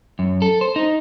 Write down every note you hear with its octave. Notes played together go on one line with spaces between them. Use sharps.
F#2
A4
C5
D#4